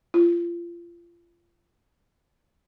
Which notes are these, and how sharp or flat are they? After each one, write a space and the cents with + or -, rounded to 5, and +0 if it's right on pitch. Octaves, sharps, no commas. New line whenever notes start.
F4 -30